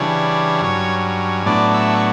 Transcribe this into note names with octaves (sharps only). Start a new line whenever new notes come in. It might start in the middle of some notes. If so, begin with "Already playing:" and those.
Already playing: C#3 E3 G3 D4 C#5
G2 F#3 C#4
A2 F#3 B3 D4 D5
E5
C#6